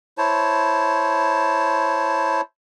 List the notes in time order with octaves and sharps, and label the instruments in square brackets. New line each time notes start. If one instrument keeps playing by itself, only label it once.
[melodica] E4 C5 C#5 A5